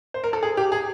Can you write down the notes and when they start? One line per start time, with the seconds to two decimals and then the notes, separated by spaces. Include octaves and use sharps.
0.14 C5
0.24 A#4
0.33 A4
0.43 G#4
0.57 G4
0.72 G#4